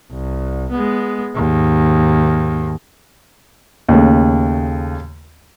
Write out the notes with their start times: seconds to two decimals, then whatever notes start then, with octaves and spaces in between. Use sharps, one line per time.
0.11 C2
0.71 G#3 B3
1.35 D#2 G#2
3.89 D#2 C#3 A3